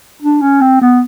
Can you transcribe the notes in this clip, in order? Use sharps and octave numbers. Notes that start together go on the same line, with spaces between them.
D4
C#4
C4
B3